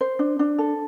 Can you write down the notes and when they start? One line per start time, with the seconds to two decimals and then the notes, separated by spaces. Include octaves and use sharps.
0.01 C5
0.19 D4
0.39 D4
0.58 A4